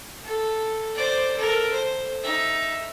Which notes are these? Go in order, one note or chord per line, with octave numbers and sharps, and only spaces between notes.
A4
C5 D5
A4 A#4
C5
D#4 E5